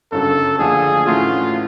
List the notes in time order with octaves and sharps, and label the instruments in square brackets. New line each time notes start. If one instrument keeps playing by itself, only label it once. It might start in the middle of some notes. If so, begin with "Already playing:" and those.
[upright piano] G1 F#2 C#3 F#3 [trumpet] A4
[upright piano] D#2 D3 F3 A3 [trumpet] G#4
[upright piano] A2 E3 A3 C#4 F#4 [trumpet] F4